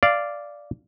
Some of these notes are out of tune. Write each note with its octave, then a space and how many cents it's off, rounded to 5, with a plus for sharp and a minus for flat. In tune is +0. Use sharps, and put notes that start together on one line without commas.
D5 -5 F5 -15